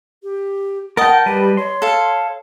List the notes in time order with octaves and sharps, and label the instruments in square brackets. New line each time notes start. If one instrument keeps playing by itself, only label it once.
[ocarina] G4
[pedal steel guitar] A#4 G5 [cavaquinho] D#5 A5 [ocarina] F#5
[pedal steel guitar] G3 B4 [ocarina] G4
[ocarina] C#5 [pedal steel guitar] C6
[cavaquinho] A4 F5